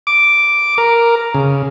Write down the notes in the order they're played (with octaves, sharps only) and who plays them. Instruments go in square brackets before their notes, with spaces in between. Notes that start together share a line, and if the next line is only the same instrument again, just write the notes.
[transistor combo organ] D6
A#4
C#3